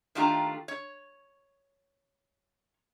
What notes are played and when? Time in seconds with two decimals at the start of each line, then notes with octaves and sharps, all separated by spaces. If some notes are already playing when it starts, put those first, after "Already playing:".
0.15 D#3 A3 D4 F4 G4 A#5
0.68 C#5